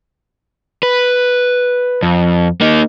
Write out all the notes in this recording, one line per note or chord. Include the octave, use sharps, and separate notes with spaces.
B4
F2
A#3 D#4